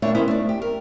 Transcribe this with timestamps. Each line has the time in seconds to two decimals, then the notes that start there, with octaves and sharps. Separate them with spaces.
0.02 D#2 A#2 A3 D4 E4 C#5
0.15 D#3 B3 C#4 E4 C5
0.28 A3 D4
0.49 G4
0.62 A#4